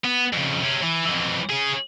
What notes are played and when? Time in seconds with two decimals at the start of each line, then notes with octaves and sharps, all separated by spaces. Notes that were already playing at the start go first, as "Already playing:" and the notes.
0.04 B3
0.33 F2 C#3
0.63 C3 C#4
0.83 E3
1.07 F2 E3
1.50 C#4 G#4